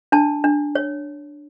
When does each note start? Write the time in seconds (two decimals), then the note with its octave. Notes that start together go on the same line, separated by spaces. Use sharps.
0.12 D4 A5
0.44 D4
0.75 C#5